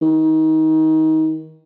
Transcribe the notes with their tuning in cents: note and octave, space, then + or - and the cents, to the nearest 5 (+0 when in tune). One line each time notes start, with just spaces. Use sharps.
D#3 +25